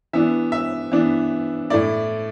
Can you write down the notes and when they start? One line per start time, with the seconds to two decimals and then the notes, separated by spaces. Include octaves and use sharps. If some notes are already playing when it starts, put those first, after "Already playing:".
0.13 E3 B3 D4 E5
0.52 E5
0.92 E3 B3 D4
1.70 A2 A3 E4 D5